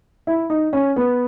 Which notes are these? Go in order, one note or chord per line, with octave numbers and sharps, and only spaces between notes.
E4
D#4
C#4
B3